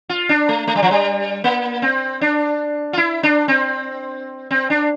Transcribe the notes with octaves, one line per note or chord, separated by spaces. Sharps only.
F4
D4
A3
A3
G3
F3
G3
A#3
C4
D4
F4
E4
D4
C4
C4
D4